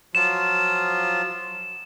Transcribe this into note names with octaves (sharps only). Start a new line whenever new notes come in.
F3 F#3 F4 E7